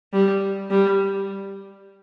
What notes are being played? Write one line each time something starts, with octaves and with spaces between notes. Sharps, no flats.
G3
G3